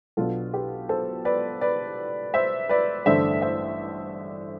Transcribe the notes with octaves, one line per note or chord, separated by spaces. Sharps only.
B1 B2 B3 D4 F4 A4
G4 B4
A4 C5
B4 D5
B4 D5
C5 E5
B4 D5
A1 G2 D3 A3 D4 C5 E5
C5 E5